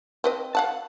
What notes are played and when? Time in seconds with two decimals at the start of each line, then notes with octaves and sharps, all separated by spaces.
0.24 C4 B4 D#5
0.55 F5 F#5 A5